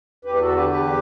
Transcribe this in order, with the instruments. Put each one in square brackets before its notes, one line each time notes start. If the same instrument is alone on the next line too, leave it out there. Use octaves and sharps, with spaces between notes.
[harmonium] E2 G4 B4
B4
F#4 A4
D3
G4 B4
E2 G4 B4